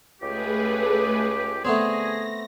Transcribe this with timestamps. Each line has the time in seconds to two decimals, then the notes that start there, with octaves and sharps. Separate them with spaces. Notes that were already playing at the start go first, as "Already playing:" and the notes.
0.21 C#2 A3 G4 G#4 B4
1.65 D3 A3 B3 C4 G#4 A#6